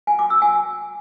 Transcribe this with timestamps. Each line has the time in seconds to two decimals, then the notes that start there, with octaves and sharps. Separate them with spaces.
0.07 G#5
0.19 D6
0.30 E6
0.42 G#5